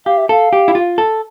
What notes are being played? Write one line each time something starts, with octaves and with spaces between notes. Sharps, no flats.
G4 F5
E5
A4 F5
G4
E4
F4
A4